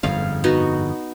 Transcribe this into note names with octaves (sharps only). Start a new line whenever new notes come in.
G1 F2 G#2 F5
B3 D#4 F#4